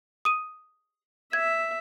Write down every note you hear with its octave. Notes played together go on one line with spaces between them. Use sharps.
D#6 D#7
E5 G#6